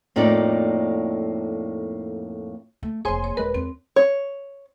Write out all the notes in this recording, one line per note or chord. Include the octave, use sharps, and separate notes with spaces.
F2 A2 A#3 D#4 D5
A3
F1 A#3 G#4 C5 C#5 G#5 C6
C#5
D#1 G#3 A#4 B4
E2 C4
C#5